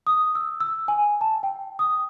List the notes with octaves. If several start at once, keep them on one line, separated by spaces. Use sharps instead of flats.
D#6
E6
E6
G#5
A5
G5
D#6